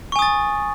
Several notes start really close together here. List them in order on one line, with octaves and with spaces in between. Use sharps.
C#6 G#5 D#6 A6